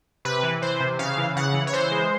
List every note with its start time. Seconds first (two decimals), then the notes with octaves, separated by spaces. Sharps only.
0.25 C3 B4
0.43 E3
0.62 E3 C5
0.80 C3
0.99 C#3 F5
1.18 E3
1.36 C#3 F#5
1.54 E3
1.67 C#5
1.73 E3 C5
1.91 G#3